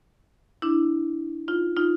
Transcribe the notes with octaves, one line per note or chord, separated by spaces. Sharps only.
D4 E4
D#4 F4
D#4 F4